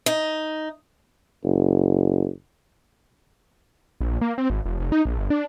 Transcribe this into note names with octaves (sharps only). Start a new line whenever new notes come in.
D#4
F#1
A#1
A#3
C4
G#1
F1
F1
D#4
A#1
G1
D4